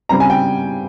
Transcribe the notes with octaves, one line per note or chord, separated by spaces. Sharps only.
C#3 G3 C4 A#5
G#5
G5